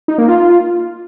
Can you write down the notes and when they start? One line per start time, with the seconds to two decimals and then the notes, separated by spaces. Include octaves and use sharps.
0.08 D#4
0.18 A#3
0.28 F4